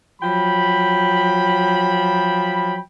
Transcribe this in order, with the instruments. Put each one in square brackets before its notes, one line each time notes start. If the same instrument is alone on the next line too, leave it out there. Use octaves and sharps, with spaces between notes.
[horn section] F3 F#3 G5 B5